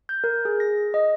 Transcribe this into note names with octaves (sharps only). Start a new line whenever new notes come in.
G6
A#4
G#4
A#6
D#5